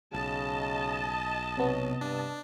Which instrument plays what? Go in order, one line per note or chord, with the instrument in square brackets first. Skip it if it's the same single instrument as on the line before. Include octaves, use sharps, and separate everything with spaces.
[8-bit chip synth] B1 [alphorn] C#3 [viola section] D#5 A5
[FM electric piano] C3 B3 [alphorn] C#5
[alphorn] G2 [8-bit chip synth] D4